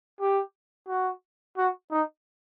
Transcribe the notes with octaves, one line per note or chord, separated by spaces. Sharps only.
G4
F#4
F#4
D#4